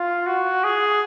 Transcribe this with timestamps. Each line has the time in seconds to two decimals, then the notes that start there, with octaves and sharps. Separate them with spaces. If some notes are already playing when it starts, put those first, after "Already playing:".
Already playing: F4
0.26 F#4
0.64 G#4